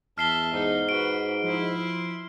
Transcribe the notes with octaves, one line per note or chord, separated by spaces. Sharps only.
E2 E5 A5 F6 C7 G7
G#2 D#4
F#4 B4 D7
F3 E4 C6